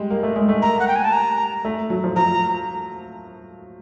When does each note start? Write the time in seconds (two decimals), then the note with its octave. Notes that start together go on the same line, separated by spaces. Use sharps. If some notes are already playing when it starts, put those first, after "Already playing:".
Already playing: G3 G#3
0.10 A#3
0.23 A3
0.36 G#3
0.49 A3
0.62 A#3 A#5
0.80 F#5
0.88 G5
0.96 G#5
1.04 A5
1.13 A#5
1.65 A3
1.90 F#3
2.04 F3
2.16 F3 A#5